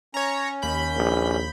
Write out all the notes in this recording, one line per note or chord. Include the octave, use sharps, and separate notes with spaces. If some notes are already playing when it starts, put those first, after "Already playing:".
C#4 C#5 A#5
D#2 B5 G6
A#1